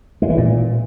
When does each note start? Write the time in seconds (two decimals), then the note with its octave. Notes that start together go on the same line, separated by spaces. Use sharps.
0.22 G#3
0.30 E3
0.37 A#2